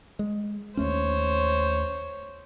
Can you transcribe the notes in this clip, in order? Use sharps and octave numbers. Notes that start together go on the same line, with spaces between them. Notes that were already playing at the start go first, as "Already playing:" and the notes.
G#3
D#2 A3 C#4 C5 C#5